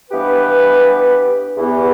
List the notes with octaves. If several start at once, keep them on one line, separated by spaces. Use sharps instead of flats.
G2 E3 B3 G4 B4
E2 E3 B3 G4